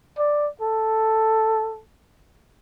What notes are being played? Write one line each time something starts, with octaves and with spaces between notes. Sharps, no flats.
D5
A4